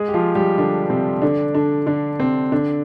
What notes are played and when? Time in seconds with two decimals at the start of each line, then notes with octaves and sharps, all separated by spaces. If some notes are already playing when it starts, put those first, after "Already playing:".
Already playing: G#3 G#4
0.09 G4
0.14 F3 F4
0.35 G3 G4
0.58 D3 D4
0.90 C3 C4
1.22 D3 D4
1.55 D3 D4
1.87 D3 D4
2.19 C3 C4
2.52 D3 D4